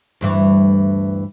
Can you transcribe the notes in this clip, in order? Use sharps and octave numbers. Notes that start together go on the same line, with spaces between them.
D2 G2 E3